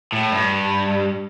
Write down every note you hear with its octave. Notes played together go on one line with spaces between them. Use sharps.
A2
G2